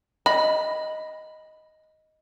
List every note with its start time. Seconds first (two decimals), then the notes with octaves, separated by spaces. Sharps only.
0.26 D#5 B5